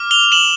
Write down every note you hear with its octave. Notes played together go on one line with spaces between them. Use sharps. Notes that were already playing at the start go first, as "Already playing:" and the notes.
Already playing: D6 F6
F7 G7
E7 F#7